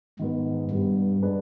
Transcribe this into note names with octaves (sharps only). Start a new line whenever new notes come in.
G#2 D#3 B3 D#4
G2 B2 G3 B3
G#3 D4 G#4 B4